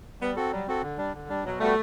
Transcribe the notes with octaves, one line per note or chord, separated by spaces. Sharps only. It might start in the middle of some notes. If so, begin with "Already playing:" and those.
G3 B3
C4 F#4 A4
F#3 G3
C4 F#4 A4
D3
G3 D4
D3
G3 D4
B2 F#3
G3 A3 B3 F#4 A4